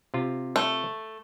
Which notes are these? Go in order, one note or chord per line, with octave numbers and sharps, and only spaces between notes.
C3 F4
A3